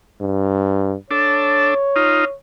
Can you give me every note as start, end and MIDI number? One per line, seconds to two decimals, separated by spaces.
0.21 0.95 43
1.11 1.74 62
1.11 1.74 69
1.11 2.34 73
1.96 2.25 63
1.96 2.25 65